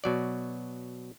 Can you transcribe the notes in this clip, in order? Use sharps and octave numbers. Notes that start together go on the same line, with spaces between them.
B2 F#3 D5